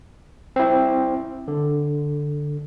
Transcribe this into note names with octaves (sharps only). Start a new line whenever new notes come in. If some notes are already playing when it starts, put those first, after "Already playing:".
C4 E4
D3